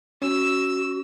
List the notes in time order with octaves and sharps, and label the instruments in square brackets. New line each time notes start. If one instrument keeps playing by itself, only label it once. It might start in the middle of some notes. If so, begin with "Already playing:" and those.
[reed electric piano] C#4 [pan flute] F#4 [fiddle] E6